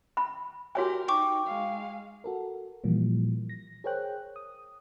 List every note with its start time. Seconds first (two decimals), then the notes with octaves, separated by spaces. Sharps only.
0.17 B5
0.75 F#4 G4 A#4 C#5 G#5
1.08 D#4 G5 C#6 D6
1.46 G#3 F5
2.24 F#4 A4 A#4
2.84 A#2 E3 F3 G3 A#3
3.49 A#6
3.84 G#4 A#4 C5 C#5 G5 F#6
4.36 D#6